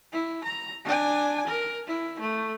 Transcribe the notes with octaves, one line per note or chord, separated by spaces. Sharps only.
E4
A#5
D4 G#5
A#4
E4
A3